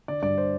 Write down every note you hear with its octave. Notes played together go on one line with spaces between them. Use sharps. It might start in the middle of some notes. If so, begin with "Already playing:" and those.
D3 D5
G2 D5
C5